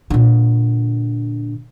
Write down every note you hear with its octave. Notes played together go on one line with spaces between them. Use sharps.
A#2 D3